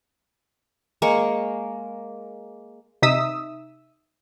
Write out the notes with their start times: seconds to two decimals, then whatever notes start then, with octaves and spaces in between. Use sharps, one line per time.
1.02 G#3 A#3 C#6
3.02 C3 D#4 E5 D#6 E6